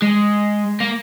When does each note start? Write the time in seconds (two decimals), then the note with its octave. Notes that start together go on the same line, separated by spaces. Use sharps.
0.02 G#3
0.80 A#3